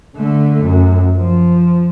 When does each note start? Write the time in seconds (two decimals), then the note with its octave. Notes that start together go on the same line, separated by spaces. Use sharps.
0.15 D3 A3
0.63 F#2
1.16 F3